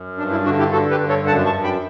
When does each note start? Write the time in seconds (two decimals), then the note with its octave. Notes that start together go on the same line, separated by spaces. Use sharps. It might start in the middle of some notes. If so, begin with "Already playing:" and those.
Already playing: F#2
0.18 G2 D4
0.31 E4
0.45 D3 D4 F#4
0.59 E4 G4
0.72 D3 F#4 A4
0.90 G4 B4
1.00 G2
1.08 A4 C#5
1.27 F#2 F#5 A5
1.46 A5 C#6
1.54 F#2
1.64 G5 B5